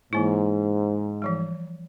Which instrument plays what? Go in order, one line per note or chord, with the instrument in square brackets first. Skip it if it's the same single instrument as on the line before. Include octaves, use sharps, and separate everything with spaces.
[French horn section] G#2 [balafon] E3 A#3 E4
[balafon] E3 F3 G3